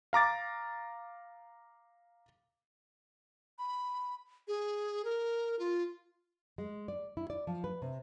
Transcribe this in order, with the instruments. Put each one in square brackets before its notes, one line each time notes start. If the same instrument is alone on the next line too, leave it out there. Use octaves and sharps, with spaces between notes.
[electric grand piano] F5 A#5 D6 A6
[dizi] B5
G#4
A#4
F4
[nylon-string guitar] G#3
D5
E4
D5
F3
B4
C3